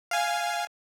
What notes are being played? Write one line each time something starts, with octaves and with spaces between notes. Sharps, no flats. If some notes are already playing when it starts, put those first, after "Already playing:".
F5 G#5